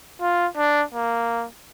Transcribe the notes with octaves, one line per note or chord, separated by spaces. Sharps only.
F4
D4
A#3